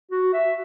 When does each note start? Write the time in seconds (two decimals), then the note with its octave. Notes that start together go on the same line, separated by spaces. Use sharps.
0.11 F#4
0.33 E5